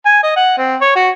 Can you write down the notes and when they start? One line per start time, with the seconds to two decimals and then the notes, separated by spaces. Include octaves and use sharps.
0.05 G#5
0.23 D#5
0.36 F#5
0.58 C4
0.81 C#5
0.96 F#4